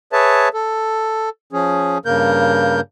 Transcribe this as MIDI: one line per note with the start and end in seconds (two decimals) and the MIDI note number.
0.13 0.49 68
0.13 0.49 71
0.13 0.49 73
0.13 0.49 76
0.13 0.49 81
0.54 1.29 69
1.53 1.98 53
1.53 1.98 61
1.53 1.98 68
2.05 2.80 43
2.05 2.80 49
2.05 2.80 58
2.05 2.80 70
2.05 2.80 91